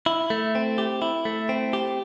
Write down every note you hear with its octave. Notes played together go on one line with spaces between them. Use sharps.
E4
A3
C4
G4
E4
A3
C4
G4